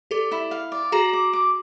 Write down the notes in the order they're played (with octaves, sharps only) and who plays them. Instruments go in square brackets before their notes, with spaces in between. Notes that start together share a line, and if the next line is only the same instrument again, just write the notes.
[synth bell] G4 A4 [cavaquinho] D5
[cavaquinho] E4
F5
D5
[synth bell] F#4 G#4 [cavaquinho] A#5
[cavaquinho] D6
D6